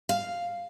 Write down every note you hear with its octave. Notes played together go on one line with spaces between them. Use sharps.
F5